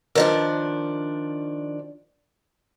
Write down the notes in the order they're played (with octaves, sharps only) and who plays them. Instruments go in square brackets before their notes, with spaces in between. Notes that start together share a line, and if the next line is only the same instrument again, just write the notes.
[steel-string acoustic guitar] D#3 F3 D4 [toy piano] A#4 B4 D#5